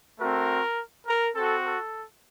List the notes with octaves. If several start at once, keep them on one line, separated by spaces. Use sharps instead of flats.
A3 C4 F#4 A#4
A#4
C4 F#4 A4
A4